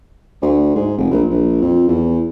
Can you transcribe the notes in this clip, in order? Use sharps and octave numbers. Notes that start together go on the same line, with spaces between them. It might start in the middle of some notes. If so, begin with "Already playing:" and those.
D2
G#2
F1
A#1
A#1
F2
E2